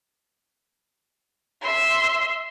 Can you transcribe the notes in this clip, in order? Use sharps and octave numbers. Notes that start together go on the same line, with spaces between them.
E5 C6